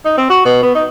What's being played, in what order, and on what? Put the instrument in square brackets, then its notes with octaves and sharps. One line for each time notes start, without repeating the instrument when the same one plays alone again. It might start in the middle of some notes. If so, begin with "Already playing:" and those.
[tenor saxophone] D#4
C4
F#4
B2
B3
D#4